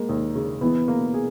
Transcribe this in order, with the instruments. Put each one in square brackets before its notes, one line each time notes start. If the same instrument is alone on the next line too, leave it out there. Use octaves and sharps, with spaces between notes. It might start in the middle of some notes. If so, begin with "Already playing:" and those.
Already playing: [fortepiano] G#3 [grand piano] A#3
[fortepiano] D#2
C#3
[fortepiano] E3 [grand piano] B3
[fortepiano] A#3
G#4